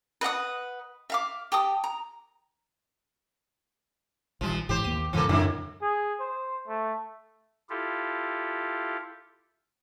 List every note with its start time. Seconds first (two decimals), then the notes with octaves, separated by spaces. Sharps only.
0.21 B4 D#5 F#5 D#6
1.10 E5 F5 D6
1.52 G4 A4 D#6
1.84 A#5
4.41 A#1 D#3 F3 G3
4.69 G#1 G#2 E3 G4 C5
4.84 D#2 A#3 D#7
5.13 E2 G#2 C#3 E3 A#3 A4
5.29 F#2 A2 D3 A#3 E4
5.82 G#4
6.20 C5
6.68 A3
7.70 E4 F4 G4 A4